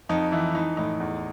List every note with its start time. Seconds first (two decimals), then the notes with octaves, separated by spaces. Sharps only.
0.09 F2 D#4
0.32 E3 E4
0.54 E3 D#4
0.77 A2 D#4
1.00 E2